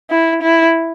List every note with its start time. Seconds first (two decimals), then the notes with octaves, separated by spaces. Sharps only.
0.10 E4
0.42 E4